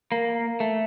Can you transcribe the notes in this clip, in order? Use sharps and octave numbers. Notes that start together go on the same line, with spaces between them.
A#3
A3